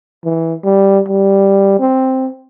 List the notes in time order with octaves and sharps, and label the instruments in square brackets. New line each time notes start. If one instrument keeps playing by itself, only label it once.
[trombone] E3
G3
G3
C4